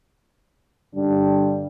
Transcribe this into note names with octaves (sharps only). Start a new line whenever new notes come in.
G2 D3 G3 D4